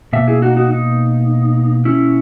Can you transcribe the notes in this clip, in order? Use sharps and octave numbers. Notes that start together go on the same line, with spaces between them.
B2 A#3 E5
E4 G#4
D#4 F#4
D#4 F#4
D#4
C#4 E4